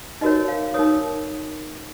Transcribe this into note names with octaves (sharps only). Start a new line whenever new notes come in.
D#4 F#4 A#4 C#5 D#5
F5
D#4 A#4 C#5 D#6